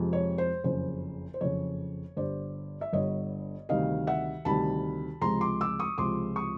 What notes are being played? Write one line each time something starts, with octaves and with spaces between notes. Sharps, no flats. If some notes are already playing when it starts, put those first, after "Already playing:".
Already playing: F2 C3 F3 G#3
C#5
C5
F#1 F2 C#3 C5
C5
F#1 F2 C#3 C#5
G1 G2 D3 C5 D5
E5
G1 G2 D3 C#5 D#5
D2 C3 D#3 G3 D#5 F5
E5 F#5
D2 C3 D#3 G3 A5 B5
C#2 C3 F3 G#3 A#5 C6
C6 D6
D6 E6
C#6 D#6
C#2 C3 F3 G#3 C6 D6
C#6 D#6